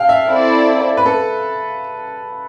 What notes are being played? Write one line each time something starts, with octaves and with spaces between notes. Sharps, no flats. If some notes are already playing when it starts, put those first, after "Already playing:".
Already playing: A4 F5 G5
E5
C4 E4 A4 D5
B4
A4